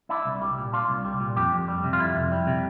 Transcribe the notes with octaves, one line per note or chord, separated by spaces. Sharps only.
D4 E4
C2
G3
A#2
D4 F4
C2
G3
A#2
F2 G4
F2
G3
C3
F4
F2 E4
F2
G3
C3